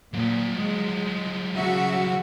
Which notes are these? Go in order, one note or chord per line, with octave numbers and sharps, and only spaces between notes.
A#2 F3 F#3
G#3
C#3 F#4 E5